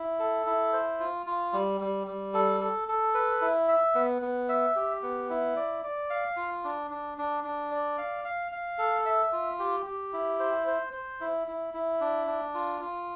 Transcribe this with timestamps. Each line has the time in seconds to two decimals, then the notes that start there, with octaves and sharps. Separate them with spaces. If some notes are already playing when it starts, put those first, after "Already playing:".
Already playing: E4
0.19 A4
0.46 E4
0.73 C5
1.00 F4
1.26 F4
1.53 G3
1.81 G3
2.07 G3
2.34 A4
2.61 A4
2.88 A4
3.15 B4
3.41 E4
3.68 E5
3.95 B3
4.22 B3
4.49 E5
4.76 G4
5.02 B3
5.30 E4
5.56 D5
5.84 D5
6.10 F5
6.37 F4
6.64 D4
6.91 D4
7.18 D4
7.44 D4
7.71 D5
7.98 F5
8.25 F5
8.52 F5
8.78 A4
9.06 E5
9.32 F4
9.59 G4
9.86 G4
10.13 E4
10.40 C5
10.67 C5
10.93 C5
11.21 E4
11.47 E4
11.74 E4
12.01 D4
12.27 D4
12.54 F4
12.81 F4